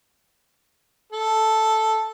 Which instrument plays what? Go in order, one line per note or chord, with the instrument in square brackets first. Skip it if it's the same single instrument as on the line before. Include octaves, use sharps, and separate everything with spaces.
[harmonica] A4